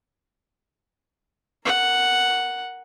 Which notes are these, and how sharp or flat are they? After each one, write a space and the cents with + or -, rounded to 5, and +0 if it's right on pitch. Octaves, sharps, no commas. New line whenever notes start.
A#4 +0 F#5 +0